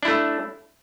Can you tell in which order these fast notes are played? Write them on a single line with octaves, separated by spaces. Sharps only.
D4 E4 A3